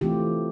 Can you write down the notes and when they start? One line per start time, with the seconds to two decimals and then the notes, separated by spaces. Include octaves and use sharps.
0.01 E3 A3 C4 F4 G4